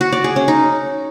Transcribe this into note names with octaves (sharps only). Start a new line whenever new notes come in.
F#4
D5
G#4
C#4
D#4